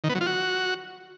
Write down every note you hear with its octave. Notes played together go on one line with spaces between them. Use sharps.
D#3
B3
F#3
F4
F#4